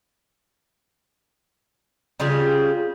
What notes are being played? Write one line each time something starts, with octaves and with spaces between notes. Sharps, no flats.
C#3 G3 F4 G#4